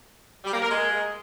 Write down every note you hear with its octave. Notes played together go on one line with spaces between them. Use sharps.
G3
A#3
A#4
G#3